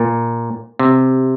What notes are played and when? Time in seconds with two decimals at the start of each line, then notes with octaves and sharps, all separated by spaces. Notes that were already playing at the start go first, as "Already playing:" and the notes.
Already playing: A#2
0.79 C3